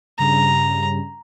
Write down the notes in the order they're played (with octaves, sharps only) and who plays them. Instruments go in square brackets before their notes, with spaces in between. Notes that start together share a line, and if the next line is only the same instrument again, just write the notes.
[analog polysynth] G2 C#3 G3 [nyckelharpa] A#5